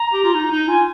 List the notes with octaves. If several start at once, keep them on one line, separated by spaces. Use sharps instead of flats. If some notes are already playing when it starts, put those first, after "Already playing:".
Already playing: A#5
G4
F4
D#4
D#4
F4 G#5